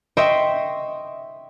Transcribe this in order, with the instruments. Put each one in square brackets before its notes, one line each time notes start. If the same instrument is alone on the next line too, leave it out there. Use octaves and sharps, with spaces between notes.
[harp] D#5 E5 G5 C6 C#6 C7